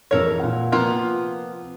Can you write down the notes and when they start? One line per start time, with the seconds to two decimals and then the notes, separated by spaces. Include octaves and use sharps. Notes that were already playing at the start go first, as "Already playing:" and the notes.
0.11 F2 G#2 E3 A4 A#4 C#5
0.40 A#2 F#5
0.72 C3 F3 A#3 B3 F4